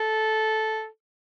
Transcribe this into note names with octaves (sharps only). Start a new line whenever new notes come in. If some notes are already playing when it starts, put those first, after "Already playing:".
Already playing: A4